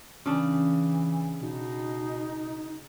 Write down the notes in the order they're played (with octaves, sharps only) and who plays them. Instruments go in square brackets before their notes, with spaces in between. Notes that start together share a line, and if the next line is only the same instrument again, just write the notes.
[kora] C#3 D4 [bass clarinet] E3
[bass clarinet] B2 [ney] D#4